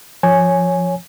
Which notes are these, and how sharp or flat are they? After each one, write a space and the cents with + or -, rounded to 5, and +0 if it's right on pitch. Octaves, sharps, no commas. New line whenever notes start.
F3 +0 C#5 +0 G#5 +0